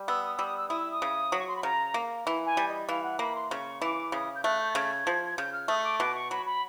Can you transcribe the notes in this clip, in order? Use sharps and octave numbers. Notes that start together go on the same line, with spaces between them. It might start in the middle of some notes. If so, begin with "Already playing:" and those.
Already playing: G3
B3 E6
D#6
G3 E6
D#6
E6
E4 D#6
E6
D#6
C#3
F#3
C#6
C6
B5
C#3 A#5
A#3
E3
G#5
G3
D#5
E3 F5
F#5
A#3 B5
C6
C#3 C#6
E3 D6
C#3 D#6
G6
A3 F#6
G6
A6
C#3 G#6
F3
C#3 G6
F6
A3 D#6
C#6
D6
B2 D6
C#6
F#3 B5
B5